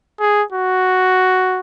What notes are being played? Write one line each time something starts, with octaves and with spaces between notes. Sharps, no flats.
G#4
F#4